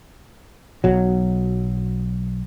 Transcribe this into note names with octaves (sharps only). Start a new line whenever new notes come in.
B1 F#3